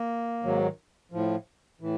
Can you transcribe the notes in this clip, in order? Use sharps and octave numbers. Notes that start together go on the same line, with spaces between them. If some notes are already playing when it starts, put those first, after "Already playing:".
Already playing: A#3
G#2 D#3 F#3
A2 F3
A2 E3